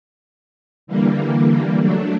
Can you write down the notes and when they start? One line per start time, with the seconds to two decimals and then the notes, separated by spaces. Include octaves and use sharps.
0.87 D3 E3 G3 A#3
1.80 F#3 A3 D4